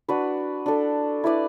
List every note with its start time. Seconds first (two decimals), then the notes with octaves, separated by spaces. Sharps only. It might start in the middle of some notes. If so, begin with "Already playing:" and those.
0.08 D4 F#4 B4 D5
0.66 D4 A4 D5
1.24 E4 B4 D5